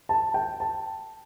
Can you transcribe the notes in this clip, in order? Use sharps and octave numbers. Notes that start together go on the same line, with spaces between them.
A5
G5
A5